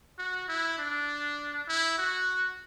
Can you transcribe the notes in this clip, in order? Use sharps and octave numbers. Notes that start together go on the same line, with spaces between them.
F#4
E4
D4
E4
F#4